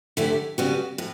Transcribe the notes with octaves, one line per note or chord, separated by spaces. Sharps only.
D3 A3 E4 G4 D5
C#3 G3 B3 F#4
A2